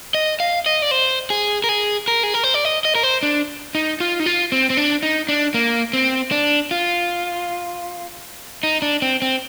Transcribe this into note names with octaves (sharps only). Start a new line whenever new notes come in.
D#5
F5
D#5
D5
C5
G#4
A#4
G#4
A#4
G#4
A#4
C5
D5
D#5
D#5
A#4
C5
D4
D#4
F4
D#4
F4
C4
C4
D4
D#4
D4
A#3
C4
D4
F4
D#4
D4
C4
C4